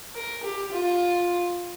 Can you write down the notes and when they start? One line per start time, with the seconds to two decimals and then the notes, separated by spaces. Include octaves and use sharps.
0.15 A#4
0.43 G4
0.72 F4